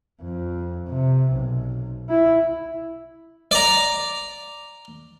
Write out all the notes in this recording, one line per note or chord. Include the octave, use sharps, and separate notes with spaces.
F2
C3
B1
E4
D5 A#5